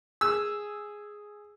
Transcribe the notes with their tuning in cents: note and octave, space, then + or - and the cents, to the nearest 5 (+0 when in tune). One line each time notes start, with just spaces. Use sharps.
G#4 +0 E6 +0